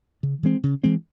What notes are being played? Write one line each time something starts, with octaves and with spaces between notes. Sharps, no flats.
C#3
E3 G#3 C4
C#3
E3 G#3 C4